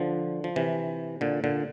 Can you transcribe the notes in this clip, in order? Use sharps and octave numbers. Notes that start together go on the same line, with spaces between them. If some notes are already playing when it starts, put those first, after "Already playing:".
Already playing: D3 F3
F3
C3 E3
A#2 D3
A#2 D3